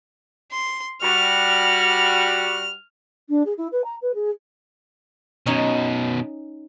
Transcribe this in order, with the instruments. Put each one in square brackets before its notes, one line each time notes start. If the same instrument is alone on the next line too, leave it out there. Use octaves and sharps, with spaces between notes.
[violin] C6
[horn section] G3 F#4 [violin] F6
[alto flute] D4
G#4
E4
B4
A#5
B4
G#4
[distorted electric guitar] F#2 B2 [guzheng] C#4 D#4 G#5